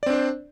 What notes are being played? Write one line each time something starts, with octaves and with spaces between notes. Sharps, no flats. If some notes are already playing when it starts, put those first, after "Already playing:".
C4 D4 C5 D5